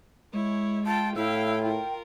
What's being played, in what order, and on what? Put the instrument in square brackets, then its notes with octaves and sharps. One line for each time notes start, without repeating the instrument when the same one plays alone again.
[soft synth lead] G#3 [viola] E4 C#5
[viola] F4 G5 [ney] A5
[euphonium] A2 [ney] E4 [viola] F5 G5 [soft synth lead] E6
[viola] F4 A#4 [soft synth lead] G5